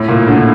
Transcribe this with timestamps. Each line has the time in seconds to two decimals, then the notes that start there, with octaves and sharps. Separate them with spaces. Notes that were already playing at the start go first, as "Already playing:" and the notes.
Already playing: A2
0.08 A#2
0.27 D3